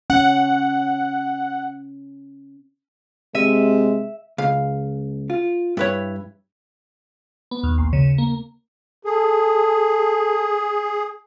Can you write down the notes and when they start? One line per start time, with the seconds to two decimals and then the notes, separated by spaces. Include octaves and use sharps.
0.10 C#4 F#5
3.35 C3 G#3 E5 D#7
4.38 C#2 F5
5.30 F4
5.77 G2 E4 B4 C#5
7.51 B3
7.63 D#2
7.78 A#1
7.93 C#3
8.18 A#3
9.05 G#4 A4